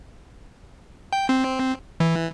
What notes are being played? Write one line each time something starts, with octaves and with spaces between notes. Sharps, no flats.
G5
C4
E3